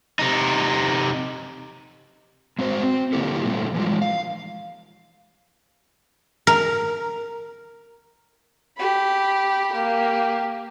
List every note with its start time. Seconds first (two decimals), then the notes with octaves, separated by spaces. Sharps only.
0.19 C3 D#4
2.59 G#3 C4 F#4 C5
2.83 C4
3.13 D3 A#3 B3 E4 G4 A4
3.45 A#2 G3 A3
3.74 E3 F3 G#3
4.02 F5
6.47 A#4
8.77 G4 B5
9.72 A#3 G4